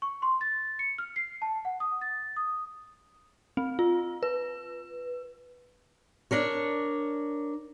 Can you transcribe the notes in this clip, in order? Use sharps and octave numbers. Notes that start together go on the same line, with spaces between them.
C#6
C6
A6
C#7
F6
C7
A5
F#5
D#6
A6
D#6
C4
F4
B4
D4 A#4 C#5